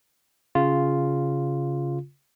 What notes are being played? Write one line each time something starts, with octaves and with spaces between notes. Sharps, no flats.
C#3 F4